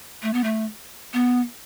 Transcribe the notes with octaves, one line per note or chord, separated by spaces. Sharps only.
A3
B3
A3
B3